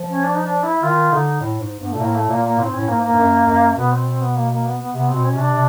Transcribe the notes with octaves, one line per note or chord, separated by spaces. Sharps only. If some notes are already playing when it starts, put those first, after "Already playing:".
Already playing: F3
C#4
D4
D#4
D4
E4
D#3 F4
D3 D#4
A2
G#2
G2 B3
A#2 A3
A2 A#3
A3
A#2 A#3
A#3
A2 C4
G#2
A2 C#4
G#2 A#3
A#3
G2
F#2
F#2
B2 B3
C4
C4
B3
A#3
A#3
B3
B3
C3 B3
B2 C4
C#4
C3 D4
C3